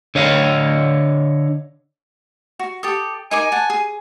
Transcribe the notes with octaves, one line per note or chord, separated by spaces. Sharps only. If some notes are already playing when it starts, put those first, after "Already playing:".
D3 C#5 D#5 F5
F#4
G4 A4 D#6
D#4 A#4 G#5 D6
F#5 A5
G#4